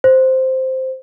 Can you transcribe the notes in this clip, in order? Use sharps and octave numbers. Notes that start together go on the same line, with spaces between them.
C5